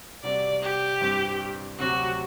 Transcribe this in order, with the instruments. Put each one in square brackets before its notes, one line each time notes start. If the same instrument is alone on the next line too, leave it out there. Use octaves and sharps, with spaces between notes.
[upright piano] C3 G3 C4 F#4 [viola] D5
[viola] G4
[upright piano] G2 E3 G3 C4
[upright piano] D2 C3 F#3 C4 G4 [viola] F#4